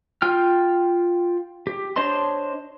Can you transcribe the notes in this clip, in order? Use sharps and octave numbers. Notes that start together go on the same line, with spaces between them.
F4 G5 F6
G4
D4 C5 C#5 D#5 C6